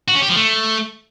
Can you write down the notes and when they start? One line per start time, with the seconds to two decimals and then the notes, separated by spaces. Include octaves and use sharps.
0.08 F#4
0.15 C#4
0.22 G4
0.29 F3
0.36 A3